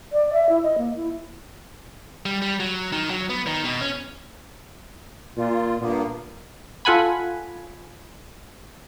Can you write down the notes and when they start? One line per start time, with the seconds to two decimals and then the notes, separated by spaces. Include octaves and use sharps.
0.13 D5
0.33 E5
0.49 E4
0.63 D#5
0.78 A#3
0.96 E4
2.26 G3
2.42 G3
2.60 F#3
2.92 D#3
3.10 F#3
3.30 B3
3.47 D#3
3.64 B2
3.81 C#4
5.37 A#2 F4
5.81 G2 A#2 A#3 B3
6.85 F4 A4 F#5 G#5 B5